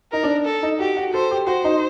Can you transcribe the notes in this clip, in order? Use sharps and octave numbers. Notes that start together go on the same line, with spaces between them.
D#4 A#4
D4
A4
D#4
F#4 G4
F#4
A4 C5
G4
F#4 C5
D#4